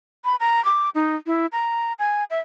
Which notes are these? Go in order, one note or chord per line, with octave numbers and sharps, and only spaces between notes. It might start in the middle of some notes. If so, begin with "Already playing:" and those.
B5
A#5
D6
D#4
E4
A#5
G#5
E5